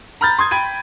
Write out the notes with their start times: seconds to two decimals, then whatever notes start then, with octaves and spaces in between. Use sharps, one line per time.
0.21 A#5 B5 F6 G6 A6
0.39 C6 D#6 G#6
0.51 G5 B5 G#6 D#7